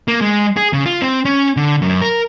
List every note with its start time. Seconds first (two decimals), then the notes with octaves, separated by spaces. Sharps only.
0.08 A#3
0.21 G#3
0.57 G#4
0.73 C#3
0.86 F4
1.02 C4
1.25 C#4
1.57 D3
1.82 F#2
2.02 A#4